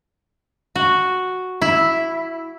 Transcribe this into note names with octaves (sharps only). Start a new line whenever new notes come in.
F#4
E4